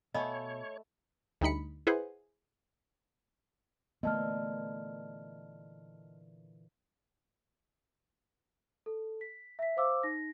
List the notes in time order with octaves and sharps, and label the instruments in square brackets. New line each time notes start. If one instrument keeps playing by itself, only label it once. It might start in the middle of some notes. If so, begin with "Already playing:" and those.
[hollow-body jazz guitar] B2 F5 G#5 [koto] A3 [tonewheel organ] C#5 [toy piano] D#5 B5 D#6
[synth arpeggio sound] D2 G3 D#4 B5 C#7
E4 G#4 B4 C5 F#5
[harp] A#2 D3 E3 [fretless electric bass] A3 B3 [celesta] D#5 A5 F6
[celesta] A4
B6
E5 B6
C5 F5 D6 E6
D#4 A#6